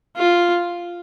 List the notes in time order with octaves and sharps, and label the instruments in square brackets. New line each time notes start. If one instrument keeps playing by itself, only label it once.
[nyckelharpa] F4